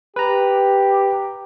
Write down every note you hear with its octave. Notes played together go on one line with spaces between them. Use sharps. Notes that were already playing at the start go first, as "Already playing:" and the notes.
G4 B4 A#5